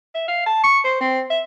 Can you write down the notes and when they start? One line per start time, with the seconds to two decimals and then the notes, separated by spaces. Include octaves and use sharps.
0.15 E5
0.28 F5
0.46 A5
0.63 C#6
0.84 C5
1.01 C4
1.30 E5